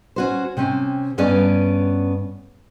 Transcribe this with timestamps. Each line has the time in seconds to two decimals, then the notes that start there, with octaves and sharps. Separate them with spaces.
0.16 C#4 F#4 C5
0.57 C3 C4 C#4 G#5
1.18 G2 B3 C#4 D5 G#5